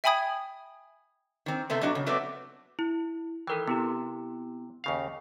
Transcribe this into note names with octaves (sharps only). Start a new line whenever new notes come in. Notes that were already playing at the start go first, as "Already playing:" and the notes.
E5 G5 G#5 B5 D#6 G#6
D#3 C4
C3 A3 B3 C5
B2 F#3 D4 F#4
C#3
F#3 A3 B3 C4 D5
E4
D#3 E3 A4 A#4 G5
C3 B3 E4 G4
D#2 C#3 F5